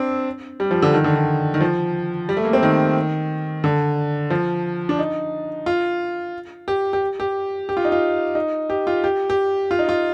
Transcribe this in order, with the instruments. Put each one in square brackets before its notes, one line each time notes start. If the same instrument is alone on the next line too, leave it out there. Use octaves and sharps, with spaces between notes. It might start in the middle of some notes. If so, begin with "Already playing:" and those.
Already playing: [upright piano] C4 D4
G3
F3
D3
D#3
D3
D#3
D#3
F3
G3
A3
A#3
C4
D#3
D3
F3
D4
D#4
F4
G4
G4
G4
G4
F4
D#4
F4
D#4
G4
F4
G4
G4
F4
D#4
F4